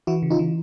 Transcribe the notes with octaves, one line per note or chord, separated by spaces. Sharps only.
E3 E4 F#4
C#3
D#4 F4
E3